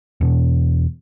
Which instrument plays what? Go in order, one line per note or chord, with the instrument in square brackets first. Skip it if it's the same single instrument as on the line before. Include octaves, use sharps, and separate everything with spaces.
[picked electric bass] E2 B2